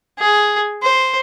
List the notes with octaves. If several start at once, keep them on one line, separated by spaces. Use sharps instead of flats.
G#4
C5